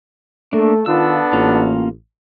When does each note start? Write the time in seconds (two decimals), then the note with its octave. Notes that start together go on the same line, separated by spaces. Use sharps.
0.53 A3 A#3 D4
0.86 D#3 B3 D4 F4 A4 E6
1.33 A1 A#3 C#4 F4